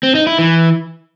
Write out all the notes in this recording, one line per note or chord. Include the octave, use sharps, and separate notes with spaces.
C4
D#4
E4
E3